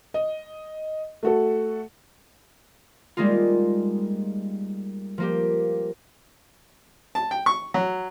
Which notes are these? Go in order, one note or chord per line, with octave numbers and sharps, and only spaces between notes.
D#5
A3 F#4 A4
G3 G#3 A#3 D#4 F4
F3 A#3 G4
A5
G5
C#6
F#3